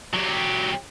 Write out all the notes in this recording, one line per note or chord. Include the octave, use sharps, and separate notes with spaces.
F#3 G4